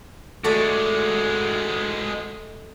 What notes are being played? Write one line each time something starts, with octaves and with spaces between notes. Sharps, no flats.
G#3 A3 F#4 D5